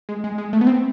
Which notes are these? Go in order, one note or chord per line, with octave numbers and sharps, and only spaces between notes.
G#3
G#3
G#3
A3
B3
C4